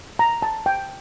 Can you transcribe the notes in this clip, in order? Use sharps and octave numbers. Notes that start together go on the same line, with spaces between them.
A#5
A5
G5